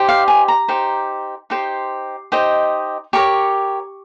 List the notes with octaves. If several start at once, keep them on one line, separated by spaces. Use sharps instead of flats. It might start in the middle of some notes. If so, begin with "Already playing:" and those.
Already playing: D#4 G4 C5
F5
G#5
A#5
D#4 G4 C5
D#4 G4 C5 C6
D#4 G4 C5 D#5
G4 A#4 C#5 C#6